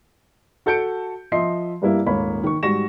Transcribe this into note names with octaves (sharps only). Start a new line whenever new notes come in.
F#4 A4 A5 G6 C#7 D7
F3 D#5 E5 C6 C7
G2 G3 A#3 E4
D#1 G#2 A#3 C#5 B5
D#3 C#6
G#2 G3 F#4 C#6 A#6 E7